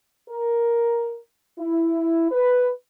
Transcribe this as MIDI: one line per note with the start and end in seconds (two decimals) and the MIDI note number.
0.29 1.19 70
1.59 2.29 64
2.31 2.67 71